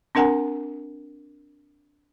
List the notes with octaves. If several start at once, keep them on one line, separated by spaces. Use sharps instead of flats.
C4 D4 A#4 F#5 G#5 A#5